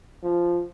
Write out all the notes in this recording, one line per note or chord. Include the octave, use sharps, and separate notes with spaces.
F3